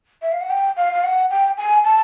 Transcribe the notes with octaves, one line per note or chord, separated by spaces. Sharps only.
E5
F5
F#5
G5
F5
F5
F#5
G5
G#5
A5